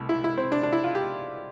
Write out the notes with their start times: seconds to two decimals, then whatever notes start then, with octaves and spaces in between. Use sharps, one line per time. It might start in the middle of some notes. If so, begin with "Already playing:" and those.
Already playing: C2 B2 A3
0.09 E4
0.24 E4
0.38 C4
0.52 D4
0.63 D4
0.73 E4
0.84 F4
0.95 G4